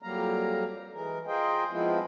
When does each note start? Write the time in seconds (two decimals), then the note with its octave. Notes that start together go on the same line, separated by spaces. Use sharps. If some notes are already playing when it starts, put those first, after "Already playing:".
0.02 F2 F#3 G3 A#3 F5 A#5
0.93 E3 G#3 A#4
1.27 F4 G#4 A#4 C5 D#5 G5
1.71 F3 G#3 B3 C4 E4 F4